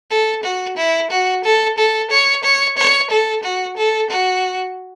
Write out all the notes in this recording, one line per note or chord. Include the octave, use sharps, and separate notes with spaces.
A4
F#4
E4
F#4
A4
A4
C#5
C#5
C#5
A4
F#4
A4
F#4